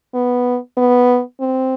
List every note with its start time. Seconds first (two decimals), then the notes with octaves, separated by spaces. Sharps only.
0.14 B3
0.77 B3
1.40 C4